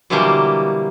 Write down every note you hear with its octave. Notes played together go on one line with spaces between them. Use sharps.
B2 D3 E3 F#3 G3 A#3